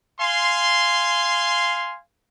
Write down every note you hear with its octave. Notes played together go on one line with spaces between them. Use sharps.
F5 G#5 C6